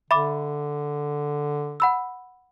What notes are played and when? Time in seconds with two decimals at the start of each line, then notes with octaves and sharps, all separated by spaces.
0.10 D3 E5 B5 D6
1.80 F#5 B5 E6